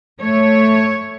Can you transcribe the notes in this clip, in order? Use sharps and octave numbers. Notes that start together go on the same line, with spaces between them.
A3 C#5